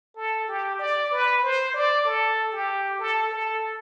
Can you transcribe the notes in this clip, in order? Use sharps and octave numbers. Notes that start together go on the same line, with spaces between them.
A4
G4
D5
B4
C5
D5
A4
G4
A4
A4